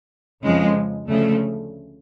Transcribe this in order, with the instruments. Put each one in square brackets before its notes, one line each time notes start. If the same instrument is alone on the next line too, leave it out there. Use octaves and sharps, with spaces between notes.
[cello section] F2 C#3 F3 G#3
D2 C#3 F3 A3